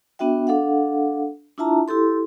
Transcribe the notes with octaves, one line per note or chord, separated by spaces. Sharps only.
B3 D4 F#4 E5 G5
D4 A4 F5 F#5
D4 E4 F4 E5 A5 A#5
E4 G4 A4 C6